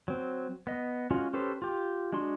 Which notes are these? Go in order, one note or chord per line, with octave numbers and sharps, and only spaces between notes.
F#3 C4
B3 D#5
G#3 C#4 F4 F#4
C#4 G4 A4 B4 C5
F4 G4
G#3 D4 F#4 C6